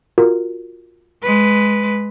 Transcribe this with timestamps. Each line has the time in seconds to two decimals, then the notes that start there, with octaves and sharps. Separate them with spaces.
0.18 F4 F#4 A#4
1.23 G#3 B4